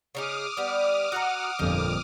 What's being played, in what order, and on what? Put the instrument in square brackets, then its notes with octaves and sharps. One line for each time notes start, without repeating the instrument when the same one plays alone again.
[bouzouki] C#3 D#4 G#4 [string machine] D6 D#6 F6
[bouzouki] G3 B3
[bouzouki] F#4 D#5 A#5 [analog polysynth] F#5
[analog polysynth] G1 F2 A#2 [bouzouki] D#4